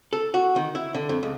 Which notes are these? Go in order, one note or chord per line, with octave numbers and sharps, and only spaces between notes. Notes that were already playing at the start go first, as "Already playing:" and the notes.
A4
F#4
D#3
E4
D3
F2
C#2